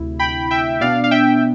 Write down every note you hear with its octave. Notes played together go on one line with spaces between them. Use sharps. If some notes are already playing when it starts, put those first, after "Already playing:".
Already playing: D2 C3 E4
G5 B5
E5 G5
B2 B3 D4 D5 F5
F5
E5 G5